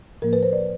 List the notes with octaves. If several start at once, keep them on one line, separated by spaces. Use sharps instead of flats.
A2 F3 A#3 A#4
B4
C5
D5